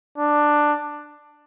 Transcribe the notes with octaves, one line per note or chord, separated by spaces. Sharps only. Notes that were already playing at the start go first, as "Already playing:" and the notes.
D4